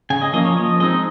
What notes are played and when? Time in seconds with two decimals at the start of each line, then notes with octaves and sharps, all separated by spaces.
0.10 C#3 G#5
0.22 D#5
0.33 F3 A#3 C#4 D#5
0.45 C#5
0.56 F3 D#5
0.80 G#3 C4 D#4 D#5